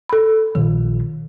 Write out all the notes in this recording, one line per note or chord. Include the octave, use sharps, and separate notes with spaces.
A4 B5
A#1 D#3